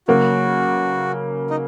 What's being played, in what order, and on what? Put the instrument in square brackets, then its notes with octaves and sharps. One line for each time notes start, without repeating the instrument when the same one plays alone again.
[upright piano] C#3 F#3 A#3 [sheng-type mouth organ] F#4
[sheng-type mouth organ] D#4